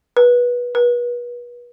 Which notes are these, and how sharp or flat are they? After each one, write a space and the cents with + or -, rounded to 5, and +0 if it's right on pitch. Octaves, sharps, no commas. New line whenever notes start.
B4 -20
B4 -35